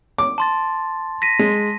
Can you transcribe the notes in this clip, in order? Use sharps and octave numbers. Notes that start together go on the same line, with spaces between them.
D6
A5 C6 A6
A#6 B6 D#7
G#3